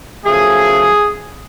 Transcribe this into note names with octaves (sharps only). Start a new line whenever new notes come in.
F#2 C#3 F3 A3 G#4